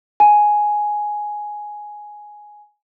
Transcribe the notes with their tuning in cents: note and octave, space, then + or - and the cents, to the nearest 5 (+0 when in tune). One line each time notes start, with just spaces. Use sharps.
G#5 +5